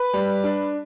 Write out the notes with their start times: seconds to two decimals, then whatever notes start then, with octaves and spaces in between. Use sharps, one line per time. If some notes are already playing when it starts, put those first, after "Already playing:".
Already playing: B4
0.14 G3
0.44 D4